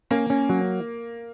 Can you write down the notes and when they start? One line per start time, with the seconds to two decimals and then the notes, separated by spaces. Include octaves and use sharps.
0.11 A#3 C#4
0.30 C#4
0.49 F#3